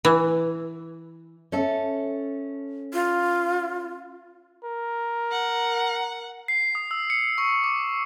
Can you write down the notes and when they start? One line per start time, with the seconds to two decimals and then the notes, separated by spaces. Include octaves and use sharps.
0.05 E3
1.52 C#4 A4 E5
2.93 F4
4.64 A#4
5.32 F#5
6.48 C7
6.75 D#6
6.91 E6
7.10 C#7
7.38 C#6
7.64 D6